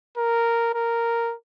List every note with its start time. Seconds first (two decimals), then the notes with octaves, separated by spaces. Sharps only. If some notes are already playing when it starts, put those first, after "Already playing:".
0.17 A#4
0.74 A#4